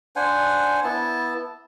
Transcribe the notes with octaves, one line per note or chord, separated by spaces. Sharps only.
D4 C5 F#5 G#5
B3 E4 A5